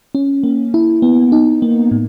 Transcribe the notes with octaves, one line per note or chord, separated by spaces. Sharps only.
C#4
A#3
E4
B3
D#4
A#3
A2